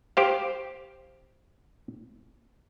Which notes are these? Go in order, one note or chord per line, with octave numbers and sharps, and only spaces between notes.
G4 C5 F5